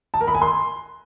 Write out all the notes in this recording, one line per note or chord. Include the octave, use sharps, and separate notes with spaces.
A5
A#4
B5
G#5
C6